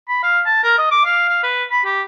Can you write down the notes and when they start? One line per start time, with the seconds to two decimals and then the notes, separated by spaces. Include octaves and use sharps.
0.09 B5
0.23 F5
0.46 A5
0.64 A#4
0.78 D#5
0.91 D6
1.05 F5
1.29 F5
1.43 B4
1.71 B5
1.85 G4